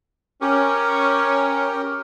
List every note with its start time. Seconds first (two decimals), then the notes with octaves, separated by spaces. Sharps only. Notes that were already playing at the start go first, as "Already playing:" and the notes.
0.42 C#4 G4 A#4